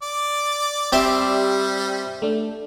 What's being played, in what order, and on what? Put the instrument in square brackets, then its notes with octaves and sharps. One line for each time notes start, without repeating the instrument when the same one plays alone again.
[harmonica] D5
[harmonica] G3 [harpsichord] C4 C5 E5 [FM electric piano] G4 D5
[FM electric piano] A3 D4